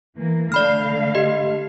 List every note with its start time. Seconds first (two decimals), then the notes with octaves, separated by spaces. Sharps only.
0.17 E3 A#3
0.52 D3 A3 D5 F5 B5 F6
1.15 G4 D#5